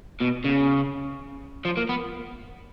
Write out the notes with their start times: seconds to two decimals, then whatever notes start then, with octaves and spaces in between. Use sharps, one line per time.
0.20 B2
0.44 C#3
1.65 F3
1.77 A#3
1.89 B3